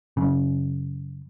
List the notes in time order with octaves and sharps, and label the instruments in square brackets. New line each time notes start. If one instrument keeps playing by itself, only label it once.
[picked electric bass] F#2 C#3